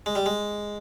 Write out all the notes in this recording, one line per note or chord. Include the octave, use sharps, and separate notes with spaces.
G#3
G3
G#3